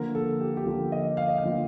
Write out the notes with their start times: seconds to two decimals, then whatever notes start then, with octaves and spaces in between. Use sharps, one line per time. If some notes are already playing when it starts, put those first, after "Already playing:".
Already playing: D3 F3 A#3 A#4
0.15 A4
0.40 G4
0.57 G4
0.66 D3 F3 A#3 A4
0.92 D#5
1.17 F5
1.28 D#5
1.38 F5
1.43 D3 F3 A#3